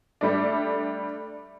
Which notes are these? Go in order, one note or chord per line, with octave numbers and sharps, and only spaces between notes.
G3 A3 D4